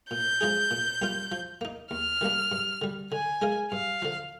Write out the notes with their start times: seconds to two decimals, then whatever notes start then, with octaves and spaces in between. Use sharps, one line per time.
0.11 A#2 G6
0.41 F3 G#3 D#4 G#4
0.71 A#2
1.02 G3 A#3 F4
1.32 F3
1.61 A#3 D#4
1.91 D#2 F6
2.21 D#3 G3 A#3 D4
2.52 G2
2.82 D3 G3
3.12 D3 G#5
3.42 G#3 D#4 A#4 F5
3.72 G2 F5
4.02 D3 F3